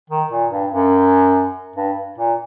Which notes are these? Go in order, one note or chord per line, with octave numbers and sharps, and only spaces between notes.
D#3
A#2
G2
F#2
G2
A#2